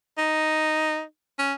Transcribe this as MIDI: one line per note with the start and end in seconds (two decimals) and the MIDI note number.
0.18 1.02 63
1.39 1.53 61